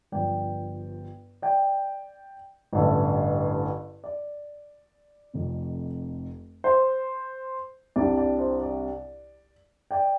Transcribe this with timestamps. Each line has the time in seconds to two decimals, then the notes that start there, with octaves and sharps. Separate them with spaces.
0.12 G1 G2 F3 D5 G5
1.42 D5 G5
2.73 A1 G2 D3 A3
4.04 D5
5.33 F1 F2 C3
6.64 C5
7.96 C2 C3 G3 D4 D5
8.18 D5
8.39 C5
8.61 D5
9.91 D5 G5